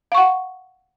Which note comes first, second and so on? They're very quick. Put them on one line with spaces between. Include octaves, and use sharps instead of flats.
F5 C#6 F#5